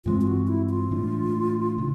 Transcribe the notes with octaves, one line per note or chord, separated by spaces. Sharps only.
G2 E3 G#3 C4 F4
F4
F#4
E4
F4
A2 E3 A3 D4
C#3 E3